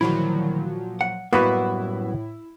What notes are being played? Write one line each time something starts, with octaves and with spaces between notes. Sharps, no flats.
D2 A#2 D#3 F3 F#3 E4
F#5
F#2 A2 G3 A#3 B3 E4 F#4 B4